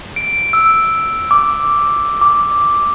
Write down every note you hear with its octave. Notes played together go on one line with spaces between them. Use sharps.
D7
E6
D6
D6